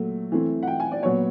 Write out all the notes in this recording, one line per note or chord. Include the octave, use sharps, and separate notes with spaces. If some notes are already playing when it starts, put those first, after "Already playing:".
Already playing: A#2 F#3 A3
E3 A3 C4
F#5
G5
G#5
D5
A#2 F#3 B3 C#5